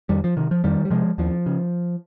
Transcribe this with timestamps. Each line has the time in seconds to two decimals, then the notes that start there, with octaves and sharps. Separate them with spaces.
0.09 F2 D#3 G3
0.24 F3
0.37 C3 D#3
0.51 F3
0.64 F2 D#3 G3
0.85 G3
0.90 C3 F3 G#3
1.18 D#2 F3
1.46 C#3